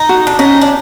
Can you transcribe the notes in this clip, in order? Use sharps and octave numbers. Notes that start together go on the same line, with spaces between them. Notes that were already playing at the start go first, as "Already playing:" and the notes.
Already playing: D#4
F#4
D4
C#4 D#4
D4